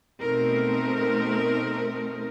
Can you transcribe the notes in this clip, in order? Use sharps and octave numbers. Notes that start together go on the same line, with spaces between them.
B2 A3 C4 D#4 A#4